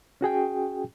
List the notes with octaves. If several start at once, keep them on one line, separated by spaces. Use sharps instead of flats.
C#4 F#4 G#4 G5